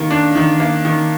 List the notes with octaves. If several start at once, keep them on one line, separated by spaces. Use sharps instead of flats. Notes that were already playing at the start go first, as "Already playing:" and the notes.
Already playing: D#3 A#3
D4
D#3
A#3
D#3